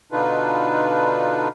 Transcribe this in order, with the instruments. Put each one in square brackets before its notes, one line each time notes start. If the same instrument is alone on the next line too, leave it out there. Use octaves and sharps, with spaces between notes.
[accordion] B2 D3 D4 D#4 F4 B4